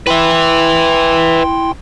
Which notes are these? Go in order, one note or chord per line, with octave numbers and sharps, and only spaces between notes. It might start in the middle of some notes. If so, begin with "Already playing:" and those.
E4 B4 E5 G5 C6